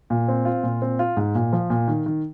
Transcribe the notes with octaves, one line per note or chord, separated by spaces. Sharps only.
A#2
C4
F4
A#2
C4
F4
G#2
A#2
F3
A#2
D#3
D#3